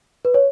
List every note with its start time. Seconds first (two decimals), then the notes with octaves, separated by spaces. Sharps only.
0.25 B4
0.34 C#5